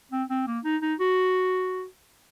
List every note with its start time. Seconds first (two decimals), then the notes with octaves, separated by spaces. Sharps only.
0.11 C4
0.30 C4
0.47 A#3
0.64 D#4
0.82 D#4
1.00 F#4